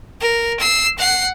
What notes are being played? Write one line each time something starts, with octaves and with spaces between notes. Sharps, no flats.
A#4
E6 C7
F#5 C7